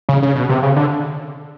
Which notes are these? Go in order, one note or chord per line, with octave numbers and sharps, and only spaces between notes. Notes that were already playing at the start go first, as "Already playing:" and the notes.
C#3
C#3
B2
C3
C#3
D3